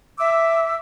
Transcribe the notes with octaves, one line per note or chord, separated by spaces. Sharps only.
E5 D6 E6